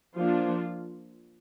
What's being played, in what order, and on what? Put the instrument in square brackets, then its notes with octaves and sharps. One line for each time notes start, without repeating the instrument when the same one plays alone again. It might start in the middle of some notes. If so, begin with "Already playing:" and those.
[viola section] F3 A#3 D4 F4